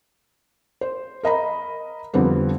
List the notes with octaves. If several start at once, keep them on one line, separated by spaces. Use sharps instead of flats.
C5
A#4 D#5 A#5 B5
F2 D3 G3 B3 C4